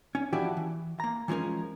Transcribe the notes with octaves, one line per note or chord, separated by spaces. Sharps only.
C#4
E3 F3 E4 F#4 G4 D5
E3
A#3 A#5
E3 F3 G#3 C#4 A#4